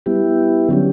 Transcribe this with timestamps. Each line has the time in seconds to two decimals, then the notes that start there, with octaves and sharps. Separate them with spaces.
0.06 G3 B3 E4 G4
0.69 D3 F#3 C#4 G4